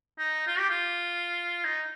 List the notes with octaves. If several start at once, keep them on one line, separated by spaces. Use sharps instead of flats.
D#4
F4
G4
F4
D#4